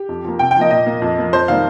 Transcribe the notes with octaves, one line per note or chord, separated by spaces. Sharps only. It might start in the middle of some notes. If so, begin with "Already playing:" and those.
Already playing: G4
F2
F3 A#3
C3 G5
G5
F3 A#3 D#5
A#2 D#5
A#3
F2
F3 A#3
F2 C5
D#3 G3 A#3 F5